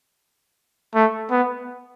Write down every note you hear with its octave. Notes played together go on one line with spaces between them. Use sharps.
A3
B3